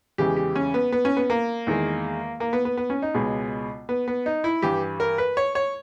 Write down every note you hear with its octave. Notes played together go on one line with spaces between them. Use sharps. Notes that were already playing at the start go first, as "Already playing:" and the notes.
E2 C#3 E3 G#3 G4
G4
C#4
B3
B3
C#4
B3
A#3
E2 D#3 G#3
A#3
B3
B3
B3
C#4
D#4
C#2 B2 G#3
B3
B3
D#4
E4
G2 E3 G3 G4
A#4
B4
C#5
C#5